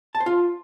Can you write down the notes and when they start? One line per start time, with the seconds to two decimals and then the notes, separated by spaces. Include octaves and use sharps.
0.15 A5
0.20 C5
0.26 F4